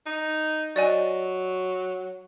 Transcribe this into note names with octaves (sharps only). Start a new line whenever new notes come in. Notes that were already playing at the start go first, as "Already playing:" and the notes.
D#4
F#3 D5 D#5 G#5